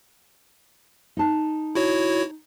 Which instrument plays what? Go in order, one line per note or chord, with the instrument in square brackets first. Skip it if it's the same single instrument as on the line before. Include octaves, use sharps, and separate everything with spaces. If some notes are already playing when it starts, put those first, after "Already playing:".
[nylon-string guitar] D#4 A5
[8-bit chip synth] E4 F#4 C#5